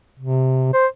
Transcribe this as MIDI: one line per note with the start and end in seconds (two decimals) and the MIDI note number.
0.19 0.72 48
0.73 0.87 72